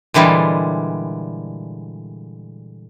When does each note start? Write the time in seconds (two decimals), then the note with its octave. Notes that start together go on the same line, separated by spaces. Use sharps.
0.14 A#2 D3 E3 G3 G#3